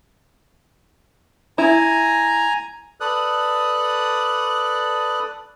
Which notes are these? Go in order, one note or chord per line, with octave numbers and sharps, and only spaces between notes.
E4 G#5 A#5
A4 B4 D5 D#6 F#6